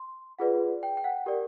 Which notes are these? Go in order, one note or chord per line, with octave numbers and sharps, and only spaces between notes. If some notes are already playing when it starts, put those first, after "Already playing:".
Already playing: C6
F4 G#4 B4 D5 F#5
G5
G5
F#5
G4 A#4 D5